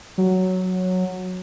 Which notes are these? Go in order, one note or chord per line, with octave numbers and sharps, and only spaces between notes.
F#3